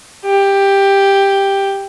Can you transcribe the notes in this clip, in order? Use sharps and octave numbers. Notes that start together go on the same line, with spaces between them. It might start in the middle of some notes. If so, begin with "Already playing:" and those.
G4